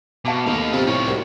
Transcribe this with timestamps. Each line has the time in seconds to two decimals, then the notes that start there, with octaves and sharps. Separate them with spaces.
0.25 B2 F5 A5 D6
0.46 D#2 A3 B3 D#4 F5
0.73 C3 F4 D#5
0.87 A2 D#4 C#5
1.06 C2 F#4 A#4